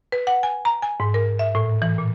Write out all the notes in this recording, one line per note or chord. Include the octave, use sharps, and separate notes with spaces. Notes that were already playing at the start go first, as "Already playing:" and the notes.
B4
F#5
G#5
A#5
G#5
G#2
A#4
E5
A2
E3
A#2